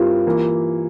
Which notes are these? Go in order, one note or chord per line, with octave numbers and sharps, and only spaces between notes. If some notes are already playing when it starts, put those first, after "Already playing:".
Already playing: G2 G3 C4 E4 F4 G4 A#4
E3 A#3